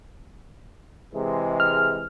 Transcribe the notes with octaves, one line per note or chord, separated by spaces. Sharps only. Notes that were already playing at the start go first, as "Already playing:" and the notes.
C3 E3 G#3
F6